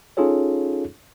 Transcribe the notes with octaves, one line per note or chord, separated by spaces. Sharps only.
C#4 D#4 F4 G#4 A4 C#5